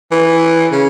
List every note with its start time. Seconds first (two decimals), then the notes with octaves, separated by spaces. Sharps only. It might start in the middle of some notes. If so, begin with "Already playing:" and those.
0.12 E3
0.72 C#3